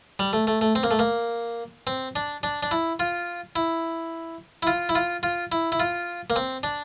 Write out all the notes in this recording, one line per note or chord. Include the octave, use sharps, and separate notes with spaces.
G3
A3
A3
A3
C4
A#3
A3
A#3
C4
D4
D4
D4
E4
F4
E4
E4
F4
E4
F4
F4
E4
E4
F4
A#3
C4
D4